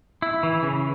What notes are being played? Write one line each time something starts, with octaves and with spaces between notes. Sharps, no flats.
E4
E3
C#3